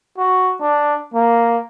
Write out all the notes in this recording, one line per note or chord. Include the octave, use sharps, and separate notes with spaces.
F#4
D4
A#3